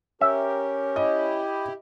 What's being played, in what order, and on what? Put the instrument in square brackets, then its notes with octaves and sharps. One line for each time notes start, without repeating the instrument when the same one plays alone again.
[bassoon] C#4 [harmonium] G4 A#4 [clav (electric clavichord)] E5
[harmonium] E4 G4 [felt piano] D#5